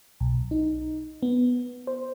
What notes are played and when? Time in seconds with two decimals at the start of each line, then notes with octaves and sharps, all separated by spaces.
0.20 B1
0.51 D#4
1.23 B3
1.87 C5